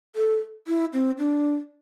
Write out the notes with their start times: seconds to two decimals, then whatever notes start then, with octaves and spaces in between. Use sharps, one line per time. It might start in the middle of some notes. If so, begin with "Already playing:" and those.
0.16 A4
0.68 E4
0.93 C4
1.19 D4